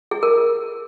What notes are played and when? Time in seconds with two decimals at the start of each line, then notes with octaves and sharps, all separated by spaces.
0.11 G#4
0.23 A#4